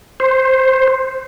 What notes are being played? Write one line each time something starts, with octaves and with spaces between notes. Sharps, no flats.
C5